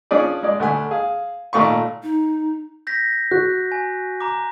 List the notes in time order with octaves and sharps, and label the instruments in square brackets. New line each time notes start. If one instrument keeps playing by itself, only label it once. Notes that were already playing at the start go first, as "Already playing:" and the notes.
[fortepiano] F3 C#4 D4 G#4 D5
G#3 D5
D2 A3 F#5 G#5
G#4 F5
G#1 A#2 A3 F5 C#6
[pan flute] D#4
[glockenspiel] G6 A#6 B6
[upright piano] F#4 [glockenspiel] F#6
[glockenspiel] G#5
A#5 D6